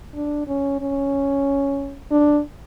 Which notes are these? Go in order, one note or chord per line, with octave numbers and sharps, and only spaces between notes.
D4
C#4
C#4
D4